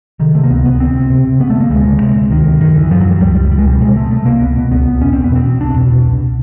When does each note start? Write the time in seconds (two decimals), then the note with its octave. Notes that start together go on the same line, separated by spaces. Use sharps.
0.20 C3 D#3
0.34 C3 A3
0.44 A#3
0.50 C#2 B3
0.65 C#2 B3
0.80 D2 C4
0.95 C3
1.10 C3
1.25 C3
1.40 C#3 B3
1.50 A3
1.56 C#3 A#3
1.70 D2 G#3
1.86 C#3
2.00 C3
2.15 C3
2.30 D2 D#3
2.46 D2
2.60 F#2 D#3
2.75 D3 E3
2.91 F#2 F3
3.01 F#3
3.06 F#2
3.11 G3
3.21 C#2 G3
3.35 C#2 G3
3.51 C#2 G3
3.59 G#3
3.66 B2 G3
3.80 C3 G#3
3.95 C3 A3
4.11 C3 A3
4.26 C2 A#3
4.41 C#2 B3
4.56 B2
4.71 C#2 B3
4.86 C#2
5.01 E2 C#4
5.13 B2 C4
5.24 B3
5.31 B2 C4
5.46 E2
5.61 C2 D4
5.76 B2
5.92 B2
6.06 C2